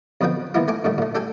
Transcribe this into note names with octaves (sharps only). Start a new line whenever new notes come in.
F2 B2 D3 F3 B4 G5
D#3 E3 A#3 B3 E4 F4
A3 G#5 A5 D6
A#2 D3 D#3 G3 A3
A#2 A3
D4 G4 A4 G5 G#5